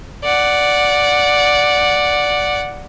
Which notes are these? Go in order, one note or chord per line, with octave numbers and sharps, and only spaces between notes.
D5 F#5